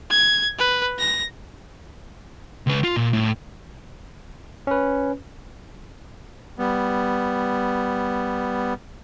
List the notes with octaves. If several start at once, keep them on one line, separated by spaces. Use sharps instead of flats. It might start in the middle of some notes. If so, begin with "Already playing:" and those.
G#6
B4
A#6
C#2 B4
F4
A#2
A2
C#4 B4
G3 B3